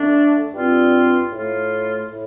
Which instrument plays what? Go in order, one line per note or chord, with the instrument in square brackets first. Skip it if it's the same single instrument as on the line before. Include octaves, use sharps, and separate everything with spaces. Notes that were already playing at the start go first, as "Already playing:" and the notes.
Already playing: [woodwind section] D3 A3 D4
G2 G3 C4 F4
A2 A3 F4
A2